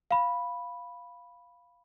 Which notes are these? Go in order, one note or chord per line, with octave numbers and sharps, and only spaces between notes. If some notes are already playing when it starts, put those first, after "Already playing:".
F5 B5